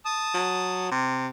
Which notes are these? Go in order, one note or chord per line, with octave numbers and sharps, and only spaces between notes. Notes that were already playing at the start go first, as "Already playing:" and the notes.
A5 D#6
F#3
C3